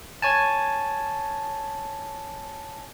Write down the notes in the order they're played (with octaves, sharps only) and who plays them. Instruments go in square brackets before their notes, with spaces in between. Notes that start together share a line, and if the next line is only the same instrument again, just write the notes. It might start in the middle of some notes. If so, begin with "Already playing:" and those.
[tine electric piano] C#5 G#5 A5